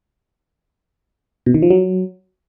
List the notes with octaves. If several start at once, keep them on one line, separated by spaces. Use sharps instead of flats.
B2
D#3
F3
F#3